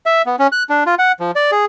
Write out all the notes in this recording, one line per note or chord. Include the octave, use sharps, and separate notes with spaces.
E5
B3
C#4
F#6
D4
F4
F#5
F3
D5
G#4